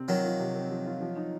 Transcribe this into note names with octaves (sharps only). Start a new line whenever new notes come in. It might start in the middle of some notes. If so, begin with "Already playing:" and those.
Already playing: C3 C4
D#3 F3 F#3
F4
C3
C4
F3
F4
F3
D#4